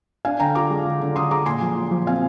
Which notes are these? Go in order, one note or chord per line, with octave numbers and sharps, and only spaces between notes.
D4 F5 G#5
D3 G5 A#5
F4 A#5 D6
G#3
D3
D3
D3 C6 D#6
G#3 A#5 D6
A#2 G#5 C6
F3
A#2
F3
C4 F5 G#5